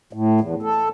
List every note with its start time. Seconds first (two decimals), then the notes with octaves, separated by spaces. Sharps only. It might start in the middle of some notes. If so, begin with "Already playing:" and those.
0.13 A2
0.41 E2
0.63 A4